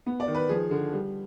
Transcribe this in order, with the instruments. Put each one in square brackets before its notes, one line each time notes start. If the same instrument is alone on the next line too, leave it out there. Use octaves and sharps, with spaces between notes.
[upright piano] B3
D5
D#3
B4
F3 G#4
D3
G3